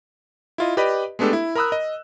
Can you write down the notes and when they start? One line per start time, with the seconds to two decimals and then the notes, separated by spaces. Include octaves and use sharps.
0.58 E4 F4 D#5
0.77 G4 B4 D5 D#5 B5
1.19 G#3 A3 B3 D4 G4 A4
1.33 E4
1.55 A#4 A#5 B5 D#6 E6 F#6
1.72 D#5